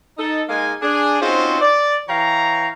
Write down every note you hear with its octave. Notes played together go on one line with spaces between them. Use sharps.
D#4 A4
G#3 A#3 D#4 F5 G#5
D4 G#4
C4 C#4 D#4 F4 F#4 C5
D5
E3 C#5 F5 G5 A#5